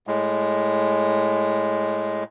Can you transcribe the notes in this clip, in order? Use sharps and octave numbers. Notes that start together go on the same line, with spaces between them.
A2 G#3